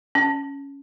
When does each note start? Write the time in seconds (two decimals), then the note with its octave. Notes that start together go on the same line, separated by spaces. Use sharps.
0.15 C#4